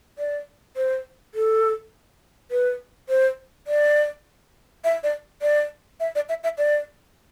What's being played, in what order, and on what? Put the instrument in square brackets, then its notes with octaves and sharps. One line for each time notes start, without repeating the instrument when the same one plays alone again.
[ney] D5
C5
A4
B4
C5
D5
E5
D5
D5
E5
D5
E5
E5
D5